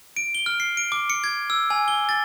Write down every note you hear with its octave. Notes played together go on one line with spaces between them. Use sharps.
D7
G7
F6
C7
D7
D6
C#7
G#6
E6
G#5
G7
A6